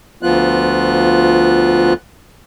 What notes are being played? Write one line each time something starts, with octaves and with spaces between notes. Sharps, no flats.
D2 F3 B3 F4 F#6